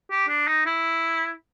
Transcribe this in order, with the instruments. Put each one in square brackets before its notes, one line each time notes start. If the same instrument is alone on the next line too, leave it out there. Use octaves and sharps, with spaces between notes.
[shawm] G4
D4
D#4
E4